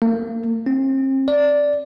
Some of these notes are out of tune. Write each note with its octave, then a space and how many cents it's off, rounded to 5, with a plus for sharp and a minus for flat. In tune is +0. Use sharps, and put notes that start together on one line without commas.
A#3 -40
C4 +40
D5 -5